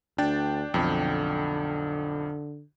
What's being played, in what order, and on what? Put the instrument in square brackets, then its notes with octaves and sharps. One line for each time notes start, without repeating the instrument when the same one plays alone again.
[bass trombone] D2 [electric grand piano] D4 G5 A6
[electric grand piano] B1 F2 G5 [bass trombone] D3